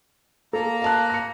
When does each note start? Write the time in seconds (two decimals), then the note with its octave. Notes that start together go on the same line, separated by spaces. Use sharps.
0.53 A#3 A4 A#5
0.82 F5 A5 F#6
1.10 A#6 C#7